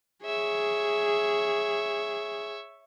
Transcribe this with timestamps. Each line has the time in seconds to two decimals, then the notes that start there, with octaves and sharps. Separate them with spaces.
0.24 G#4 C#5 E5